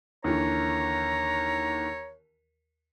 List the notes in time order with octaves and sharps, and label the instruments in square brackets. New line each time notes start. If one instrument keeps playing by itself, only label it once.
[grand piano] D#2 D3 E3 [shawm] C#5 [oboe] A#5